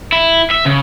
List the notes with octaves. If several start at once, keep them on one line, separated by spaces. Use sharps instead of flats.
E4
E5
C#3